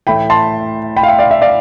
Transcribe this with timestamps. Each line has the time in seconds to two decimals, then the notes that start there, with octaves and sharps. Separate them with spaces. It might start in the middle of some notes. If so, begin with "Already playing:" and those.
0.07 A2 E3 A3 E4 G5 B5
0.30 A5 C6
0.96 G5 B5
1.03 F5
1.07 E5 G5
1.19 D5 F5
1.31 E5
1.42 D5 F5